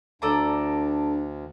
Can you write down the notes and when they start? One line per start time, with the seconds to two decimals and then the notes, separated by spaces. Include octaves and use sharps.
0.22 D2 D4 A4 D5 A#5